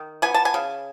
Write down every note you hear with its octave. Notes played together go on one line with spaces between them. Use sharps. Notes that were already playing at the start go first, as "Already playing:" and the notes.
Already playing: D#3
B3 G#5
A5
G#5
C#3